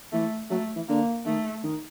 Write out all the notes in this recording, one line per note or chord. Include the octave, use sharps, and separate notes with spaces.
E3 A3
F#3 A3
E3
D3 A#3
D#3 A3
D#3